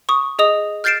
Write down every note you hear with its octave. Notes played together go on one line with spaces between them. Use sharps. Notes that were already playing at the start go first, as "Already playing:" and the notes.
C#6 D#6
G#4 D#5 D#6 F7
F6 G6 A6 C7 D7 E7